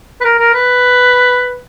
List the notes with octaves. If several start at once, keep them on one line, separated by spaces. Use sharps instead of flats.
B4
A#4
A#4
B4